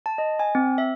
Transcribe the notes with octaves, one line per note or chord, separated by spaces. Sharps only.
A5
D#5
G#5
C4
E5